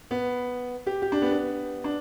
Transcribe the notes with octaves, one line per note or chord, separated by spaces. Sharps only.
B3
G4
G4
D4
B3
B3
D4